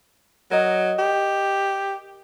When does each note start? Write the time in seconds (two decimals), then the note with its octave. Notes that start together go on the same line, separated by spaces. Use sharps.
0.51 F#3 A#4 D#5
0.99 G4